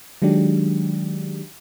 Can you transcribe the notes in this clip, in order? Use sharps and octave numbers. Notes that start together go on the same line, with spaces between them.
D#3 F#3 G#3 D4 G4